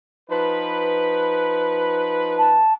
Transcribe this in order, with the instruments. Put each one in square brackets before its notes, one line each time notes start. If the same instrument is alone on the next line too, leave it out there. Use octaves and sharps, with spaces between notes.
[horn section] F3 D#4 B4
[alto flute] A5